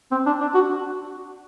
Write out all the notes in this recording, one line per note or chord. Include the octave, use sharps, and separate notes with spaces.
C4
D4
D4
F#4